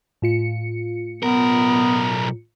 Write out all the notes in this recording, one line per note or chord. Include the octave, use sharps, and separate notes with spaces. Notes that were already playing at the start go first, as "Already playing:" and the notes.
A2 F4 C#7
B1 B3 A#4